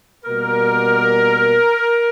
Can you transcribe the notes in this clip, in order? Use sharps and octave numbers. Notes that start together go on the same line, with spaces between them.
B2 G3 A#3 A#4